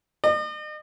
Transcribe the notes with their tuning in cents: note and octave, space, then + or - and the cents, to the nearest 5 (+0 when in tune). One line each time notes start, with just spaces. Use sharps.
D#5 -40